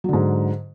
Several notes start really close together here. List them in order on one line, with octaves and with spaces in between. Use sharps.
F#3 D3 G#2